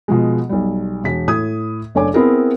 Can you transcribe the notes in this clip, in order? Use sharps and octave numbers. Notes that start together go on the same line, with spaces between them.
B2 F3 G#3
B1 G3
E1 B6
A2 D#6 G#6
F#1 A3 D4 C#5 G#5 D6
B3 C4 E4 G#4 A#4